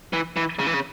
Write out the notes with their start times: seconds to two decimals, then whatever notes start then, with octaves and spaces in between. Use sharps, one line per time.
0.13 E3
0.36 E3
0.59 C#3
0.67 E3
0.74 C#3